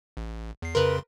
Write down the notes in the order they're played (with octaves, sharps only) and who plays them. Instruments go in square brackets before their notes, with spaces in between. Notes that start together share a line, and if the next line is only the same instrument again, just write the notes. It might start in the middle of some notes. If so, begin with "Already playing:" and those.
[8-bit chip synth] A1
E2 C7
[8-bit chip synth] F2 C#3 C6 [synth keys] A#4 B4